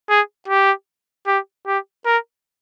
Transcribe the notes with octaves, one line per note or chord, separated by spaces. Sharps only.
G#4
G4
G4
G4
A#4